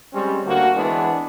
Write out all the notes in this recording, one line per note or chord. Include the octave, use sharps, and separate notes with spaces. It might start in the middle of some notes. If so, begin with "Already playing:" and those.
G3 G#3 C4 C#4
D2 D3 A#3 D4 F#4
E3 G#3 B3 C4 D4